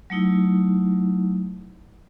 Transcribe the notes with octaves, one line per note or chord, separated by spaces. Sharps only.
F#3 A3 D#4 E4